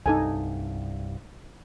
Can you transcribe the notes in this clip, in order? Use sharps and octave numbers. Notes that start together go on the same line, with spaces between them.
C2 G2 D#4 A4 G#5